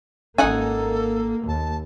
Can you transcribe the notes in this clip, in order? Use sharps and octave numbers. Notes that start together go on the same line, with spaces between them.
G#1 A#3 C#4 D#4 A4 F#5 G#5
D#2 A5